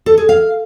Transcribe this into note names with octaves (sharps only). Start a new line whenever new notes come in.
A4
G#4
F5